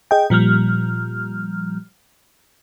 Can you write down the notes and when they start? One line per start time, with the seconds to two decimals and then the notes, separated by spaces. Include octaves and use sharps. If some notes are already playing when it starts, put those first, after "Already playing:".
0.11 G#4 D#5 G5
0.30 A#2 F3 G3 F6